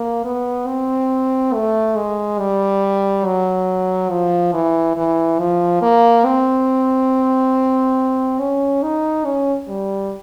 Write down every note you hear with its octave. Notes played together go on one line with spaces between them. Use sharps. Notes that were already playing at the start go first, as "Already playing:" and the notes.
Already playing: A#3
B3
C4
A3
G#3
G3
F#3
F3
E3
E3
F3
A#3
C4
C#4
D#4
C#4
G3